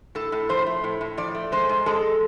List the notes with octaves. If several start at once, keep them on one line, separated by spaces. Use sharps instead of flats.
A2 A4
A2
F3 C5
A3
A2
A2
F3 D5
A3
G#3 C5
G#2
G#3 A4